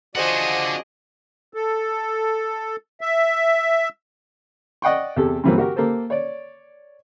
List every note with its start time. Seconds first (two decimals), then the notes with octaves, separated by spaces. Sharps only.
0.15 F3 D4 F#4 G#4 C5 D5 D#5 F#5
1.54 A4
3.01 E5
4.82 D5 D#5 F#5 G5 C#6
5.17 E2 C3 G4 A4
5.44 G2 C3 E3 F#3 A#3 C4
5.58 F#4 G4 A#4
5.76 A#3 G4 A4 C5
6.10 C#5 D5